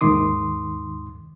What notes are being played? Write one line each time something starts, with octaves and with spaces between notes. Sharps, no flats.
D#2 G#2 D#3 C6 D6 D#6